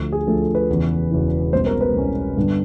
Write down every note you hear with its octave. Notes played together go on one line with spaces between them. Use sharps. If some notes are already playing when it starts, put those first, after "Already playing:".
Already playing: D2 D3 F3 A3
G#4
D2 D3 F3 A3 A4
A4
B4
E1 E2 C#3 E3
E1 E2 C#3 E3
C2 B2 G#3 C#4 C5
A#4
B4
C2 B2 G#3 C#4
G2 D3 G3 B3 D4